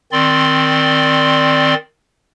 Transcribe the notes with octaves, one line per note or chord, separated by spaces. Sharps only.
D#3 C4 D5 C6